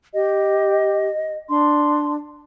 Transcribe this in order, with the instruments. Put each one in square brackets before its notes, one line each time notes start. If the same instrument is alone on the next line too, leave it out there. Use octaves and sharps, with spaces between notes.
[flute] G4 [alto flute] D#5
[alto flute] D4 [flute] C6